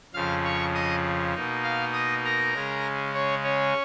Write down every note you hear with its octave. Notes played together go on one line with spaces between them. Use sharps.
F2 C#3 F3 F5 F6
C#5 C#6
D#5 D#6
B2 A#3 D#4
F5 F6
D#5 D#6
A#4 A#5
C#3 G#3 C#4
C#4 C#5
C#4 C#5